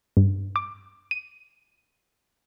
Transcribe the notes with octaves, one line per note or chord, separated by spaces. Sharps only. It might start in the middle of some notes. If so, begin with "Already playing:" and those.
G2
D6
D#7